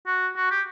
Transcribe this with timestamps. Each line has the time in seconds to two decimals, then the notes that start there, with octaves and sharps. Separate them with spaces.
0.07 F#4
0.37 F#4
0.51 G4